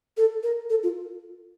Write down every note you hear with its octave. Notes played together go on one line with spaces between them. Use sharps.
A4
A#4
A4
F4